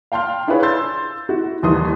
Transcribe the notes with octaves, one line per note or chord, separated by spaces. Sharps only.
F5 G5 A5 C6 F6
D4 E4 F4 G#4 B4 C#5
C6 E6 G6 A6
E4 F#4
D#1 D#2 E3 C6 D#6